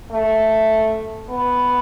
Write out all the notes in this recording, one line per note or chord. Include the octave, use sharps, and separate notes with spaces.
A3
B3